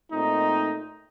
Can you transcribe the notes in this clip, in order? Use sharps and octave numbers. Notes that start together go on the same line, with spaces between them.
A#2 A3 C4 D#4